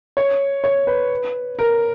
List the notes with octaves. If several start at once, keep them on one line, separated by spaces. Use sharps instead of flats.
C#5
C#5
B4
A#4